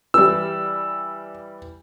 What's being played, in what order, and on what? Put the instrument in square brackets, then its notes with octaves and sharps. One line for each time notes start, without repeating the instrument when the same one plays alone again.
[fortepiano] E3 G3 [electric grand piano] E6